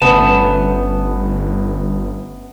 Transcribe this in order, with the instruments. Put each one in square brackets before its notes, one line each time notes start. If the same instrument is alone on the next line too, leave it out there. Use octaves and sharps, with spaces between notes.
[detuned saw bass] G1 [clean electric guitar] A3 C#4 A5 [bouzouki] B3